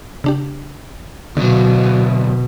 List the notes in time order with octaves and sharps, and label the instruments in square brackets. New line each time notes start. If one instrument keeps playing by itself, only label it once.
[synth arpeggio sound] C#3 D4 G4
[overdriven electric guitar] D2 F#3 [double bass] B2 [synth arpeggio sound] D3